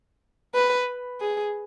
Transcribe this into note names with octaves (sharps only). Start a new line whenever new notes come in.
B4
G#4